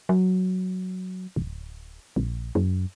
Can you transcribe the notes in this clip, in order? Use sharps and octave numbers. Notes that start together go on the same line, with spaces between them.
F#3
D1
A#1
F#2